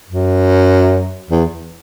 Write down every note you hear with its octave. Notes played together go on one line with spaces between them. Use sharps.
F#2
E2